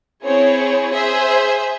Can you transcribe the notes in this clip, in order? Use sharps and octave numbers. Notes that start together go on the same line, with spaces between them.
C4 E4 G#4 C#5
G#4 C5 E5